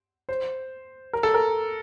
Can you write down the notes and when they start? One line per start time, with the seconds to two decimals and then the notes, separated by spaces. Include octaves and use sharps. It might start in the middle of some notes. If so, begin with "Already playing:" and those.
0.29 C5
1.13 A#4
1.23 A4
1.34 A#4